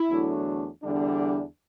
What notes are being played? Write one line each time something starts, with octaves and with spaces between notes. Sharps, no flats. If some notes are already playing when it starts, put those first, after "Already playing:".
Already playing: E4
E2 D3 F#3 A3 D4
E2 D3 G3 D4